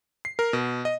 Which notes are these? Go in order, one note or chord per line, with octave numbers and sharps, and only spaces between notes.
C7
A#4
B2
D#5